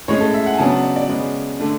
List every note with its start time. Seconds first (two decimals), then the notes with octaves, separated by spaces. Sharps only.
0.08 A2 G#3 C#4 C#5
0.21 A4
0.34 E5
0.46 F#5
0.54 G#5
0.58 C#3 F#3 B3 D4 A5
0.71 F#5
0.83 D5
0.96 D5
1.09 C#3 G#3 B3
1.59 D3 A3 D4